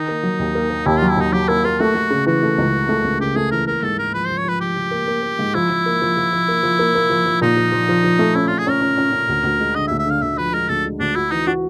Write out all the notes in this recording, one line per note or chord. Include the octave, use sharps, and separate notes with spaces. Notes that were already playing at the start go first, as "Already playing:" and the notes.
Already playing: D#3 D#4
A#3
F#3
D#2
A#3
A#3
D#2 E4
F#3 F4
E4
D#2 D#4
F#3 G4
A#3 E4
A#3 F4
A3 F#4
A3
C#3
E3 F#4
A3
C#2
E3
A3
C#2
C#3 G4
A3 G#4
E3 A#4
A#3 A#4
G#2 A4
G#2 A#4
F3 B4
F3 C5
C#5
F3 B4
F3 G4
F3
A#3
A#3
A#3
G#2
F3 E4
F3
A#3
F3
F3
F3
A#3
F3
A#3
A#3
F3
F3
A#2 D#4
F3
F3
F3
F3
A3
C#4 E4
C#4 F4
G#4
C#4 A#4
C#4
C#4
C#4
D2
D2
G#3
D3 D#5
E5
D2
E5
D3 F5
D2 E5
F3 B4
G#3 A#4
D2 A4
G#3
D2 D4
E4 F#4
E3 D#4
D4 F#4